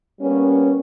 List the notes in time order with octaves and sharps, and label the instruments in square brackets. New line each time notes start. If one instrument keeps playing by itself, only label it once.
[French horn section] G3 A#3 B3 C#4